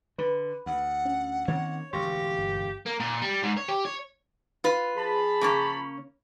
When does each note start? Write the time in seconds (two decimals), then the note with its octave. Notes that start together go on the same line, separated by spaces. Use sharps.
0.18 D3 B4
0.66 D2 F#5
1.05 C#4
1.48 D#3 A#3 C4 C#5
1.93 E1 A1 D3 G4 F5 C6 C#6 A#6
2.38 G1
2.86 A#3
3.00 A#2
3.21 G3
3.43 G#2
3.57 C#5
3.68 G4
3.85 C#5
4.64 F4 B4
4.96 F3 G#4 A5 B5
5.41 C#3 A#3 C#4